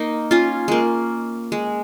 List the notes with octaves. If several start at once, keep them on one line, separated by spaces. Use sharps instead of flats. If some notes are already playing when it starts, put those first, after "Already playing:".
Already playing: A#3 D#4
C#4 F4
G#3 A#3
G#3